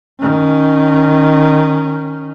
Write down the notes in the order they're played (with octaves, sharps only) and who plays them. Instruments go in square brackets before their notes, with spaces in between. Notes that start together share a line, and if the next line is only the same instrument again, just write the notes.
[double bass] D#3 C#4